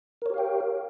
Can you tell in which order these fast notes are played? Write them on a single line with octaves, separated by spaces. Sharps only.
A#4 C#5 G4 F5 G5